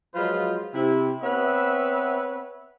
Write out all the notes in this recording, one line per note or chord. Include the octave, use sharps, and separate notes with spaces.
F3 F#3 G#3 F4 B4 C5
C3 E4
B3 C4 B4 C#5 E5